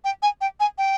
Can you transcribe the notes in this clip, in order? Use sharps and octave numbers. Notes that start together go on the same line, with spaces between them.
G5
G#5
G5
G#5
G5